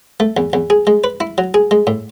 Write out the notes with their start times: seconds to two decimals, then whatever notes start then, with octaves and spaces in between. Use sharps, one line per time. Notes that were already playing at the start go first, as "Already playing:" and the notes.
0.20 A3
0.37 E2
0.53 E2
0.70 G#4
0.87 G#3
1.04 B4
1.20 E4
1.38 F#3
1.54 G#4
1.71 G#3
1.87 A2